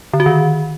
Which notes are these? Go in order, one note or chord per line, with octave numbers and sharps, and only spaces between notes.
D3
F#4
D#3